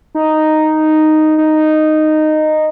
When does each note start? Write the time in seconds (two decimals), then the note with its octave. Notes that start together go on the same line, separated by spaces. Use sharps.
0.15 D#4
1.38 D#4